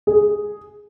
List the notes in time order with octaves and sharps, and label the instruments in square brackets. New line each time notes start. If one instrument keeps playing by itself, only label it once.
[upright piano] G#4